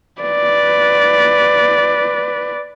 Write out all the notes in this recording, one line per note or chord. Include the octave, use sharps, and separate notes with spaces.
B4 D5